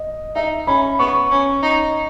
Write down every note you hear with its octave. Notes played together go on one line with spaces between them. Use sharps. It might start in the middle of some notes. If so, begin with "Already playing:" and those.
Already playing: D#5
D#4 E5
C#4 B5
B3 C#6
C#4
D#4